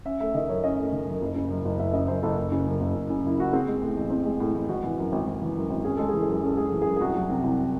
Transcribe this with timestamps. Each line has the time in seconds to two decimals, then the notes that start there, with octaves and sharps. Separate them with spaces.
0.05 C#4 E5
0.20 A3 E5
0.35 D#3 D#5
0.49 F#2 C#5
0.64 C#4 D#5
0.79 A3
0.92 D#3
1.07 F#2
1.22 F#1
1.36 C#3
1.50 F#2
1.65 F#1
1.79 F#1 E5
1.93 C#3 D#5
2.08 F#2 C5
2.23 F#1 A4
2.38 F#1
2.52 C#3
2.67 F#2
2.80 F#1
2.95 F#1
3.10 C#3
3.24 F#2 E4
3.38 F#1 F#4
3.52 C4 G#4
3.68 G#3
3.82 A2
3.97 A1
4.10 C4
4.26 G#3
4.40 A2
4.54 A1
4.69 G#1 F#4
4.83 E3
4.98 F#2
5.12 G#1
5.27 G#1
5.41 E3
5.56 F#2
5.70 G#1
5.84 C#4 G#4
5.97 G#3 A4
6.09 E3 G#4
6.21 A4
6.28 F#2
6.33 G#4
6.43 C#4 A4
6.57 G#3 G#4
6.69 E3 A4
6.82 F#2 G#4
6.96 G#4
7.01 C2 F#4
7.15 F#3
7.29 C3
7.44 C2